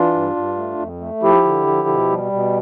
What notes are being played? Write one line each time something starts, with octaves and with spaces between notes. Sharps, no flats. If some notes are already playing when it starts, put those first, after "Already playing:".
Already playing: E3 D4 F4
G2
G2
A3
F2
A3
F3 E4 G4
D3
F3
B2
G3
B2